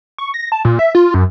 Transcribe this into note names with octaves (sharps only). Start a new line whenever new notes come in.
C#6
A#6
A5
A#2
E5
F4
F#2